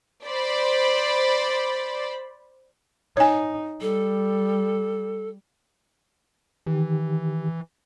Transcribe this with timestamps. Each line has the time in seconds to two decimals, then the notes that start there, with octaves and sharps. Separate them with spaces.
0.25 C5 D5 B5
3.17 D#4 C#5 G#5
3.82 G3 A4
6.67 D#3 E3 G4